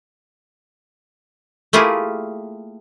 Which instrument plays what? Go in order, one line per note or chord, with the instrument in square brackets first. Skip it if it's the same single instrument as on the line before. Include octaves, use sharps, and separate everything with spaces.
[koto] A3 A#3 E4 F4 G4 G#4